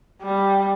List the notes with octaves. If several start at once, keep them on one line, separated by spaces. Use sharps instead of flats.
G3